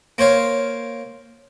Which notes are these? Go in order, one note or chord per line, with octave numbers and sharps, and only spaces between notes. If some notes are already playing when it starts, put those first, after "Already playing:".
A#3 C5 C#5 F5